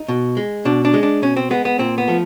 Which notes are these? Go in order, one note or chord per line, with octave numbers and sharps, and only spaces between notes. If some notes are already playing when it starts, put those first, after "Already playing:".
Already playing: D#4
B2
G#3
B2 D4
D4
G#3
D4
B2 C#4
C4
G#3 B3
B3
A#2 C4
B3
F3 A3